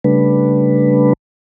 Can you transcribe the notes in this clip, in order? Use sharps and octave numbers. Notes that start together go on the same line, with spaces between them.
C#3 G3 A3 D4 B4